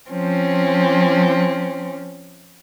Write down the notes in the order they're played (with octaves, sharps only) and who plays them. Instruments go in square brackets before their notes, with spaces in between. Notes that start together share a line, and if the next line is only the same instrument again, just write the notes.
[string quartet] F3 C4 C#4